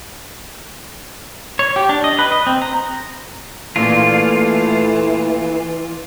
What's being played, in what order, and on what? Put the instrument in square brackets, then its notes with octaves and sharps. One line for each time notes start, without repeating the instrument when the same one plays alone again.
[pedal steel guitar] C#5
G4
D4
D#5
B4
D#5
C4
A#5
[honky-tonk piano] A#1 A#2 [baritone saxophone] E3 [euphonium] A3 [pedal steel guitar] F4